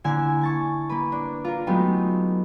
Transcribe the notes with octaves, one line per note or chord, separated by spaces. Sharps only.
D3 A#3 E4 G#5 E7
G#5 A5 C#6
A#3 B4
D4
F4 A#4
F#3 G#3 A3 B3 D#4 G4